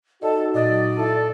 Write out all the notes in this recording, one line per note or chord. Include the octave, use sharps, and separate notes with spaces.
D#4 F#4 A4 D5 D#5
A#2 F#3 D5 D#5
E4 A4 E5